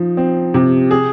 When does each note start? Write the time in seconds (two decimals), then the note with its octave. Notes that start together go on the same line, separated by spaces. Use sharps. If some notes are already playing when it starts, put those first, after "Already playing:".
Already playing: F3 D#4
0.17 C4
0.54 C3
0.91 G#4